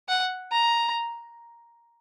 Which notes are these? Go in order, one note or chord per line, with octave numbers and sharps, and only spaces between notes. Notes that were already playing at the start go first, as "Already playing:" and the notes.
F#5
A#5